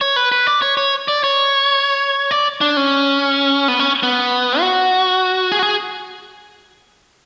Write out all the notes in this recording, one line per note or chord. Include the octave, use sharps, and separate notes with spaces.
C#5
B4
B4
D5
C#5
C#5
D5
C#5
D5
D4
C#4
B3
C#4
B3
F#4
G#4
F#4
G#4